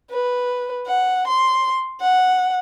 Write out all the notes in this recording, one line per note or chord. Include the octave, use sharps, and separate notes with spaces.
B4
F#5
C6
F#5